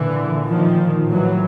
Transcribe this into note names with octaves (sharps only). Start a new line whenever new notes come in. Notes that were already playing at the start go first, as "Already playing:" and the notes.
Already playing: A#2 D3 E3
D#3 F3
A2 E3 F#3